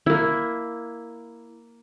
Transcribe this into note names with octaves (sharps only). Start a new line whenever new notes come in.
A#3 E4